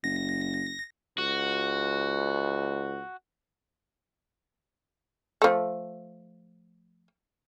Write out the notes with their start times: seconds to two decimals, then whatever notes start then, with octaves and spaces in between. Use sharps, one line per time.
0.04 F#1 A#6
1.18 C#2 F#4
5.42 F3 A3